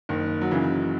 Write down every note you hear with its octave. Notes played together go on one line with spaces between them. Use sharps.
F#1 D#3
F#3
C#3 E3